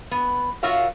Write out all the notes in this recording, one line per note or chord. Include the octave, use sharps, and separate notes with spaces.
B3
F4 F#4 A#4 C#5 E5 F5